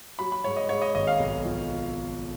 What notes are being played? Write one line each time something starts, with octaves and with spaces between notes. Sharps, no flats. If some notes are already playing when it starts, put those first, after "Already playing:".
F#3 B5
B5
G#2 C#5
D#5
G#2 C#5
D#5
G#1 D#5
F5
B1
F3